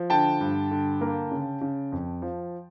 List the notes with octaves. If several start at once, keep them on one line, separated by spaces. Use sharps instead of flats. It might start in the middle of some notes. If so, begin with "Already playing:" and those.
Already playing: F3
D3 G5 A5
G2
D3
A#3
C#3
C#3
F2
F3